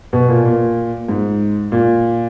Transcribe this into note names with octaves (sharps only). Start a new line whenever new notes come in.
B2
A#2
A#2
G#2
A#2